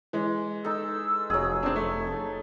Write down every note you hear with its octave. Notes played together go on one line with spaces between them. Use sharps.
E3 G#3
D#4 A4 E6
F1 F#3 G#4
C4 D4
A3 C#6
A4